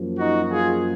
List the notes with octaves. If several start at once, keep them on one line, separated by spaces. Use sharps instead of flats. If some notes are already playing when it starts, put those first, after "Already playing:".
Already playing: F#2 F3 A#3
D#4 F#4
F4 G#4